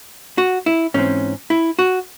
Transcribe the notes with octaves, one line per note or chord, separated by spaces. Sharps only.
F#4
E4
G#2 E3 C4 C#4
E4
F#4